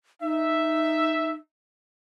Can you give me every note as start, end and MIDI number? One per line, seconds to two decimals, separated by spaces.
0.21 1.33 63
0.21 1.34 76